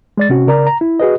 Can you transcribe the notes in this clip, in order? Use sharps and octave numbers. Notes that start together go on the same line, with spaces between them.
G#3 D5 A6
C3 C#4 F#4
C#3 A#4 D5 A#5
A#5
E4
F#4 G#4 B4 D#5